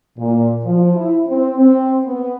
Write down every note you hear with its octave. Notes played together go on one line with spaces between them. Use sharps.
A#2
F3
E4
C4
C4
B3